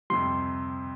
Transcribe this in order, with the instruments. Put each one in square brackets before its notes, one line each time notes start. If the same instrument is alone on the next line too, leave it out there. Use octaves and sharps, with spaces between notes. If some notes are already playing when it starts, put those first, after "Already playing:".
[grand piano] F2 C3 G3 [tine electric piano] C6